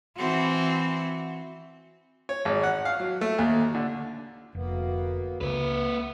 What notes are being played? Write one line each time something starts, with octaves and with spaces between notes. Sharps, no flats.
E3 C4 F#4
C#5
G#1
F#5
F5
F#3
A3
D#2
D3
F1 D2 A#3 B3
C#2 A#3 B4 E5